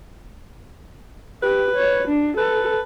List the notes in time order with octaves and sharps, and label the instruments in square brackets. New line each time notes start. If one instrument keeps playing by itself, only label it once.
[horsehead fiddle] G4 [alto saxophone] B4
[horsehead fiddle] C#5
D4
[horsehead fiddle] A4 [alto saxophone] B4